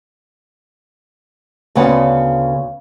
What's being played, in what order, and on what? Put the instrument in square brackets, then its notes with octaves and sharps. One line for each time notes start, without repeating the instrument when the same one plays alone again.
[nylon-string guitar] D2 C#3 B3 F#5